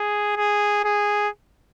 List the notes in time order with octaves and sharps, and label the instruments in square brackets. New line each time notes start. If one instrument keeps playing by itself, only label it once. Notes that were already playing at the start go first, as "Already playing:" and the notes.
Already playing: [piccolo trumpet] G#4
G#4
G#4